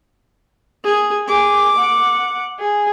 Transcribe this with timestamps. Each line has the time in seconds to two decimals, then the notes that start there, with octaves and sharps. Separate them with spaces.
0.84 G#4
1.28 G#4 D6
1.79 F#5
2.60 G#4